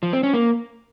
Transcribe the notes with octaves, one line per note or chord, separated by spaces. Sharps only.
F3
C4
C#4
A#3